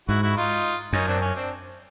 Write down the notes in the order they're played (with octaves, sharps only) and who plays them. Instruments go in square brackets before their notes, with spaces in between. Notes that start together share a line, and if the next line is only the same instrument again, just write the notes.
[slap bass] G#2 [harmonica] E4 F#4
[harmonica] E4 F#4
D#4 F4
[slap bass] F#2 [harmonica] C#4 D#4
[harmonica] C4 D4
C#4
C4 D4